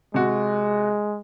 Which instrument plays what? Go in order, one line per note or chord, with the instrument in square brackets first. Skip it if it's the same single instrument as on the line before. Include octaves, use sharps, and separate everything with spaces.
[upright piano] C3 F#4 [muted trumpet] G#3